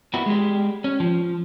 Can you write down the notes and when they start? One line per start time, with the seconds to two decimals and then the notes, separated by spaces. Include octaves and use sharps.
0.14 A#3 B3 E4 F#4
0.26 G#3 G4
0.84 C#4
1.00 F3